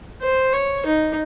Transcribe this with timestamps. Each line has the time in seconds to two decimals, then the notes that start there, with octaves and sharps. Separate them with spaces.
0.22 C5
0.53 C#5
0.86 D#4